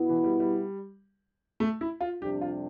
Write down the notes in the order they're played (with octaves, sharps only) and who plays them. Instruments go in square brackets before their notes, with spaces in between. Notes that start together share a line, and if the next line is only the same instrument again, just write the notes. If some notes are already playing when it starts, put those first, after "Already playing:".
Already playing: [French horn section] B2 B3 E4
[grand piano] E3
G3
G3
A3
E4
F4
[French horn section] F2 C3 G3 D4 [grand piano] G4
[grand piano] F4